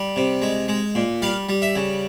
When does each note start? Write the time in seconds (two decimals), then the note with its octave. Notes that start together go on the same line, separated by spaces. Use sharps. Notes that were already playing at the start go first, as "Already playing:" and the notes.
Already playing: G3
0.16 C3
0.42 G#3
0.68 G#3
0.95 A#2
1.22 G3 F5
1.49 G3
1.62 E5
1.76 C#3